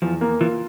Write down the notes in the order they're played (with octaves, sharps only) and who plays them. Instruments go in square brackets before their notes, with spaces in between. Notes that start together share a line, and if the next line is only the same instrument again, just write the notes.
[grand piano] E2 [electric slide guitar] F3
[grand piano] A#3
[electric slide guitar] E3 [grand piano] F4